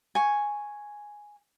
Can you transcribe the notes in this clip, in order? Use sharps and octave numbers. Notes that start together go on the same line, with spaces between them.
G#5 C#6